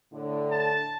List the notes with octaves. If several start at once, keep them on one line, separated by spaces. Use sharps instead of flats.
A2 D3
A5